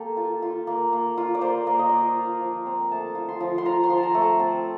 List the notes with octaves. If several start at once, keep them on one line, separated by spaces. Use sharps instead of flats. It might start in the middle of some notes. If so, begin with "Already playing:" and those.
Already playing: A#3 G4 A4
F4
F4
A#3
A#3
F4
D5
A#3 C5
A#3
D#5
F4 D5
D#5
F4 F5
F3
C4
A3 A5
F4
C6
F3
C6
F4 A#5
C6
F3
A5
A#5
A3
A5
C4 A5